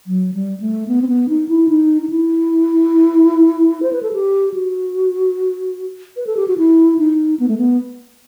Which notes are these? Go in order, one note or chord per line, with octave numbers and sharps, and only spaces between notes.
F#3
G3
A3
B3
C4
B3
D#4
E4
D#4
D#4
E4
C5
B4
A4
G4
F#4
B4
A4
G4
F#4
E4
D#4
B3
A3
B3